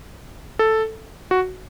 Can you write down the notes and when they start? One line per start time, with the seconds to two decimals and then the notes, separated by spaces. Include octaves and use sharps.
0.59 A4
1.31 F#4